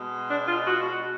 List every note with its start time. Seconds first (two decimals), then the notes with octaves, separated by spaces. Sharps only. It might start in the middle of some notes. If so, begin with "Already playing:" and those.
Already playing: B2 G#3
0.29 D4
0.48 F4
0.67 F#4